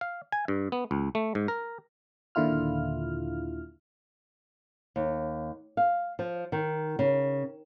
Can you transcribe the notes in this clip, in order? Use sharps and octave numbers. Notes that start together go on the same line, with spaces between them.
F5
G#5
G2
B3
C#2
A3
G#2
A#4
D#2 A#2 D3 E4 F4 F6
D#2
F5
F3
D#3
C#3